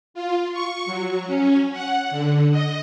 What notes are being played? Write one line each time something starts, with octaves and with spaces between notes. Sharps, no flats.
F4
C#6
F#3
C#4
F#5
D3
D#5